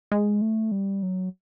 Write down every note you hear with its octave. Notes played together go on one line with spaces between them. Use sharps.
G#3
A3
G3
F#3